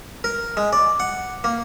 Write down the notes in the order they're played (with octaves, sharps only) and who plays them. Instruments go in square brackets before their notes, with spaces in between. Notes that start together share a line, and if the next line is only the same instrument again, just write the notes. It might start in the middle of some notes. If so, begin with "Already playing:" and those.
[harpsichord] A#4
G#3
D5
F#5
A#3